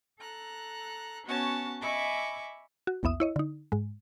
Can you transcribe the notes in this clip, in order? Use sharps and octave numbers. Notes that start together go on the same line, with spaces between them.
A4 A#5 F#6
B3 C#4 F#4 C#5 A5
D#5 E5 G#5 B5 C#6 D6
F#4
A#1 E2 B3 E5 D#6
E4 C#5 D#5
D3 D#4
G#2 G#3